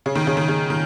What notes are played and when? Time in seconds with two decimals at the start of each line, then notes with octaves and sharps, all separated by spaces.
0.06 C#3
0.15 D#3
0.27 C#3
0.37 D#3
0.48 C#3
0.70 D#3